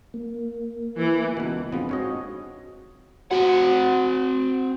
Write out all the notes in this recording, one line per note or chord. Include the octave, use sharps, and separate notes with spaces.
A#3
E3
C#2 B2
F3 B3 C4 D4 G#4
G#2 C4 D#4 F#4 C#5 D#5
C4 F#4 F#5